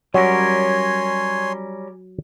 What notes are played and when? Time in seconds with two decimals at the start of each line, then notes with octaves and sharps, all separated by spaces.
0.14 F#3 G3 C#4 A#4 C#5 G#5 C6